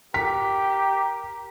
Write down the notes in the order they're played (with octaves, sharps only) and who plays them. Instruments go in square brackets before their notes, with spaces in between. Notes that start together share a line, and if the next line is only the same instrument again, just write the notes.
[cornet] G4 [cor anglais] A#4 [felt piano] B6